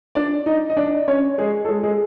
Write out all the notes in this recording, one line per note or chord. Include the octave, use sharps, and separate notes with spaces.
D4 D5
D#4 D#5
D#5
D4 D5
C#4 C#5
G#3 G#4
A4
G#3 G#4
G#3 G#4